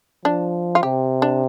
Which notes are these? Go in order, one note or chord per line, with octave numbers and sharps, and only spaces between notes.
F3 D4
F4
C3 G4
D4